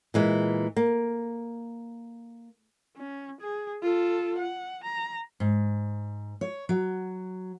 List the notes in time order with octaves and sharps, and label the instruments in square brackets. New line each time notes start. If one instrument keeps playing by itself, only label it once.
[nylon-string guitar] A#2 E3 G#3
A#3
[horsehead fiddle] C#4
G#4
F4 A4
F#5
A#5
[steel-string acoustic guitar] G#2
C#5
F#3